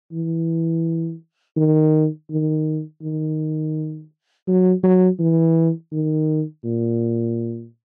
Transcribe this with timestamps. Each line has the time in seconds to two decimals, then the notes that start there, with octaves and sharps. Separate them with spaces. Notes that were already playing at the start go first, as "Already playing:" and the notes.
0.13 E3
1.57 D#3
2.30 D#3
3.02 D#3
4.48 F#3
4.83 F#3
5.19 E3
5.92 D#3
6.64 A#2